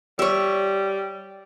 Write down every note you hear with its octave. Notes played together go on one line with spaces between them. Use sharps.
G3 C#5 E5